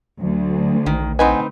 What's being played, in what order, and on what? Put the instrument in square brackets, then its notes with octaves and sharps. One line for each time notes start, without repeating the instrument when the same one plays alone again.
[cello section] D2 [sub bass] F#3
[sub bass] A#1 [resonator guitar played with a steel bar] D#3
[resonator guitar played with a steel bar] C4 D#4 B4 [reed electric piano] D#5 F#5 G#5